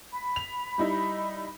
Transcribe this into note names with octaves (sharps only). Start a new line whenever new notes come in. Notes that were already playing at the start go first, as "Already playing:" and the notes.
B5
F7
G3 D#4 E4